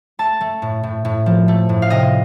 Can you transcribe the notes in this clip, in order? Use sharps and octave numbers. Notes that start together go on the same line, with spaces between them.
A3 A5
A3
A2
A2
A2
F3
A3
A2
F5
C3 D#5